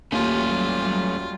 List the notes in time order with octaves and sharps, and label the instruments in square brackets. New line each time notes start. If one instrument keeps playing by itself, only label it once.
[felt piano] D#2 [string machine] F#3 G3 [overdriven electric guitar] A3 C#4 [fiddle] F4